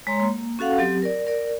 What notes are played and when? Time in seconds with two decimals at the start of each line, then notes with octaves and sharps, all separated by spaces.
0.07 G#3 C#5 A#5 C6
0.20 A#3
0.59 C#4 F#4 A4 F5 F#5
0.78 F#3 C4 G4
1.02 A#4 D5
1.27 A#4 D5